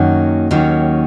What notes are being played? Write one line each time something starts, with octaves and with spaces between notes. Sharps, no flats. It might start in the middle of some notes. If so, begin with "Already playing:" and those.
Already playing: F#2 D#3 F#3 A#3 C#4
D#2 D#3 F#3 A#3 C#4